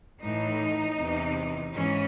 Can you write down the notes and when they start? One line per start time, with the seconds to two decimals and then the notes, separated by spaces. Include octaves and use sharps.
0.21 A2 E3 D#4
0.98 E2 C3 E3
1.74 G#2 E3 C#4